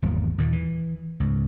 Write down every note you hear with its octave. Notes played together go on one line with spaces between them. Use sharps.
G#1 E2 G3 A#3
D#2 A#2 D#3
E3
C#2 G#2